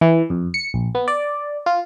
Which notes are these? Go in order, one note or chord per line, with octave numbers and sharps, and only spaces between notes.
E3
F2
C#7
A#1
B3
D5
F4